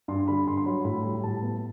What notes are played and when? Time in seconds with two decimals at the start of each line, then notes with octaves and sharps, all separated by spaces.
0.08 G2 C6
0.28 D3 B5
0.46 G2 C6
0.57 C6
0.66 F#3 B5
0.85 A2 B5
1.05 G3
1.24 A2 A5
1.43 B3